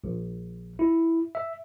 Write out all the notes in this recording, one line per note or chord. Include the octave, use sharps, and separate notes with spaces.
A#1
E4
E5